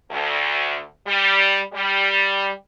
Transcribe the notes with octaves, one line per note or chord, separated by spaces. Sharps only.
D2
G3
G3